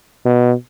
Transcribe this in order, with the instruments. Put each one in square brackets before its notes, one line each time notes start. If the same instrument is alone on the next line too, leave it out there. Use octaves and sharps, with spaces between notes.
[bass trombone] B2